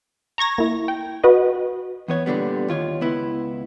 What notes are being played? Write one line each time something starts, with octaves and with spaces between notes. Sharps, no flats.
A#5 C#6 G#6 A#6
A#3 E4
G5
F#4 B4 D#5
E2 B3 C#5
A#2 D3 G3 B3
D#2 F4 C#5
C#2 B3 E4